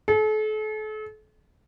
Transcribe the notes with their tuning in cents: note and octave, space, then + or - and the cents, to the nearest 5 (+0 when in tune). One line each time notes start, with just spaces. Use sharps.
A4 -40